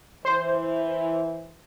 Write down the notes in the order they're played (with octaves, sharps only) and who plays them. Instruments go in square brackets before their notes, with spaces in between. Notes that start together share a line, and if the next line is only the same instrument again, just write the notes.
[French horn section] E3 [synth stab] C5